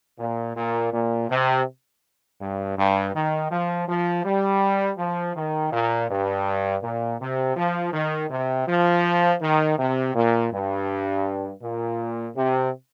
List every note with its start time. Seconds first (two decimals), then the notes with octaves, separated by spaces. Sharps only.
0.19 A#2
0.56 A#2
0.93 A#2
1.30 C3
2.41 G2
2.78 G2
3.14 D#3
3.51 F3
3.89 F3
4.25 G3
4.98 F3
5.36 D#3
5.72 A#2
6.10 G2
6.82 A#2
7.20 C3
7.56 F3
7.93 D#3
8.30 C3
8.68 F3
9.41 D#3
9.78 C3
10.15 A#2
10.52 G2
11.62 A#2
12.36 C3